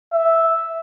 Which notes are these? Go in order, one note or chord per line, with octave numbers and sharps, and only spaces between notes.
E5